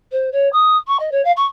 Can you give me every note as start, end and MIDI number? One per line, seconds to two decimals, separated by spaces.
0.12 0.29 72
0.32 0.49 73
0.52 0.76 87
0.87 0.97 85
0.99 1.11 75
1.11 1.22 73
1.24 1.31 77
1.36 1.45 85